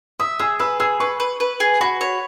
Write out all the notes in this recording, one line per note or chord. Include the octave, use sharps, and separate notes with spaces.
E5 D#6
G#4 E6
B4 E6
G#4 E6
B4 C#6
B4
B4
G#4
F#4 B5
C#5